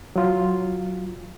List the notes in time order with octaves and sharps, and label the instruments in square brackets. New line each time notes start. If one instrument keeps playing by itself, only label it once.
[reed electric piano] F#3 F4